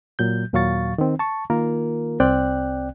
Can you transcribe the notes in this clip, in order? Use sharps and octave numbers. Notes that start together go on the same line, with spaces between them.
A#2 F#3 G6
D#2 A#2 F#3 F5 C#6 A6
D#3 C4
A5 C#6
D#3 A#3 F4 A#4
C2 C4 D5 G5 F#6